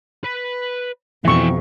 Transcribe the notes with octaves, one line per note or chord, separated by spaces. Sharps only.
B4
F2 B2 E3 E5 G5 C#6